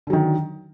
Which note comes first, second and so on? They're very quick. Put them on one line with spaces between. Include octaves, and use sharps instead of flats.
D3 F#3 D#3